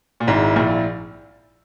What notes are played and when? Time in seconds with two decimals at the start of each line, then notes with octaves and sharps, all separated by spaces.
0.20 A#2
0.27 G#1 G#2 E4
0.56 A#1 A#2